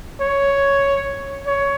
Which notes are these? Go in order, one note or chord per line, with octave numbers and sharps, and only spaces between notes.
C#5
C#5